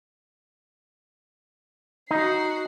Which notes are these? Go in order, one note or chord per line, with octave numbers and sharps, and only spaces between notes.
D#4 F#4 C7